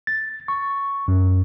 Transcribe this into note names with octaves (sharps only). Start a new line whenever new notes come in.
A6
C#6
F#2